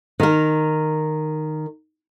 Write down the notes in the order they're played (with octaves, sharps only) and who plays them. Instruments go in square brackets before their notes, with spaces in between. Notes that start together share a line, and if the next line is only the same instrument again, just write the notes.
[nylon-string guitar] D#3 A#4